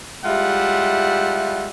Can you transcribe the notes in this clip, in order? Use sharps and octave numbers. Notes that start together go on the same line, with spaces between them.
G3 G#3 E4 F4 E5 F#5